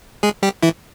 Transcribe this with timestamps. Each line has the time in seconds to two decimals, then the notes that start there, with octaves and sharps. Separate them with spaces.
0.23 G#3 G#4
0.43 G3 G4
0.63 E3 E4